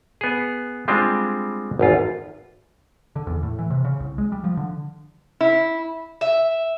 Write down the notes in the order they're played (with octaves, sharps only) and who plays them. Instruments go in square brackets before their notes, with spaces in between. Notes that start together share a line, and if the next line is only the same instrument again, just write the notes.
[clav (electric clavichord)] B3 G#4
G3 G#3 C4 D4 F4
G#1 E2 F4
[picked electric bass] D3
E2
A2
E3
C3
C#3
C2
G#3
G3
F3
D3
[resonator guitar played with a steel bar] E4
[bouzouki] E5